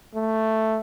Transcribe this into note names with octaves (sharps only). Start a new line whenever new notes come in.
A3